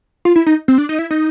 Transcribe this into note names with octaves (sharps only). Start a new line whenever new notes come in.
F4
E4
D#4
C4
D4
D#4
E4
D#4